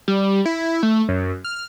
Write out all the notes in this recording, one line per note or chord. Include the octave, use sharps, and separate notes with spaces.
G3
E4
A3
F#2
F6